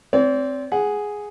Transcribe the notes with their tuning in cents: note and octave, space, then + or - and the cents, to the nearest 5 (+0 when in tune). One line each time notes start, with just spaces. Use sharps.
C4 +0 D5 -40
G#4 +0 F#5 +0